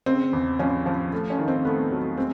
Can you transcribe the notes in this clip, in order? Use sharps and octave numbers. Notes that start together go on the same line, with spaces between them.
C#3 C4
E2
F3 C#4
F3
A3
C#4
D#3
C4
A3 B3
F#3
G#3 C4